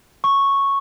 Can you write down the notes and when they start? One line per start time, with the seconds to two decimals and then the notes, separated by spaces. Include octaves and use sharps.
0.24 C#6